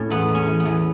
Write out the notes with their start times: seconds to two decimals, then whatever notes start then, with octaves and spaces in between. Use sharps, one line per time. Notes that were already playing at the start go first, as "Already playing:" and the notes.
Already playing: A2 C#4
0.10 E2 B3
0.29 E2
0.35 C#4
0.48 E2
0.60 B3
0.65 E2